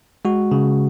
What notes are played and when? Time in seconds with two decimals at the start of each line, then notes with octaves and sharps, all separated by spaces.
0.25 G#3 F#4
0.51 C#3